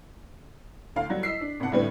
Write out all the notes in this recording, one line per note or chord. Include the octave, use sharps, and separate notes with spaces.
D2 F5
F#3 G3
D#5 E6 B6 C7
D4
G#1 C3 F#5 A5
A2 D3 G3 C4 B4